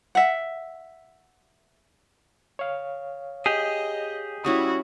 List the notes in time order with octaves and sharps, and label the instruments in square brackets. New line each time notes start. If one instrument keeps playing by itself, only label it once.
[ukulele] E5 F#5
[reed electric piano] C#5 F5
[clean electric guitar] G4 G#4 [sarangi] D#5
[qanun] G3 C#4 E4 [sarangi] F#4 [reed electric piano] D#6